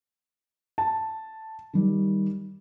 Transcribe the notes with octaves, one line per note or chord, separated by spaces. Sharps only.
A5
D#3 G3